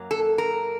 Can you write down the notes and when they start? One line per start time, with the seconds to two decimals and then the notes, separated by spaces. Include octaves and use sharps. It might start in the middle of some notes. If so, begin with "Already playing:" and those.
Already playing: F#2 F#3 A#3
0.11 A4
0.38 A#4